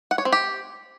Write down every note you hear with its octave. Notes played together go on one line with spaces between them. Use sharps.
F#5
C#5
C4
G4